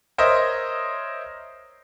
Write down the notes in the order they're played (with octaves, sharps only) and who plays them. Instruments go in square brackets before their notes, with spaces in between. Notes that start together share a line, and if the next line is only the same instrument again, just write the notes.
[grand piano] A#4 C5 C#5 D#5 E5